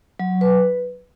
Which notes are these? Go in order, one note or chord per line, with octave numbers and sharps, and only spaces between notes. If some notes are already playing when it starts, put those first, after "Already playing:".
F#3
B4